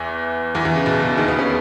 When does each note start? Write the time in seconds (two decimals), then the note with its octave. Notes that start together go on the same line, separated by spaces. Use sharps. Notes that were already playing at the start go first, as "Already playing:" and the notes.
Already playing: E2 E3
0.55 E2 E3
0.65 E2 E3
0.76 C#3
0.86 B2
1.02 C#3
1.17 D#2 D#3
1.28 B2 B3
1.39 C#3 C#4